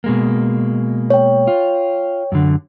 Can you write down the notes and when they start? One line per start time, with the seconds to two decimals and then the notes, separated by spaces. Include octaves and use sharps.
0.04 B2 G#3 A#3
1.10 C#5 G5
1.47 F4
2.32 F#2 D3